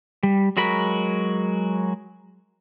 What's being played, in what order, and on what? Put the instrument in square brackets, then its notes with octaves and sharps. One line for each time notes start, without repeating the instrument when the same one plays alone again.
[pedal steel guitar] G3
F#3 G#3 F#4 A#4 B5